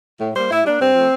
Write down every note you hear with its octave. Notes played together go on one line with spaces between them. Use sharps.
A2
G3 A#3 C5
A2 E4
G3 A#3 D4
G2 C4
F3 A3